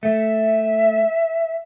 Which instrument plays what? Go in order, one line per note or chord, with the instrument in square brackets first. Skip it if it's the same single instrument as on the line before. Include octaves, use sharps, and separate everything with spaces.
[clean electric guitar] A3 [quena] E5